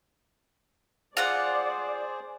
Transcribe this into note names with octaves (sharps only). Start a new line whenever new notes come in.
F4 G#4 C5 D5 F#5